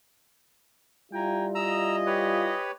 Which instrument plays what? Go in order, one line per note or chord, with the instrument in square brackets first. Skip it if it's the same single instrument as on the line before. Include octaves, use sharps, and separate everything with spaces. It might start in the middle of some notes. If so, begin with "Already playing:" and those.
[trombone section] G3 E4 F4 [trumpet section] G5 G#5 A#5
[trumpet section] G#4 D#5 [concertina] A#5 E6
[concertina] G4 B4 C#5